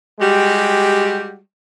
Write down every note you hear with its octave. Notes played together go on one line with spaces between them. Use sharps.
G3 G#3 F#4 G4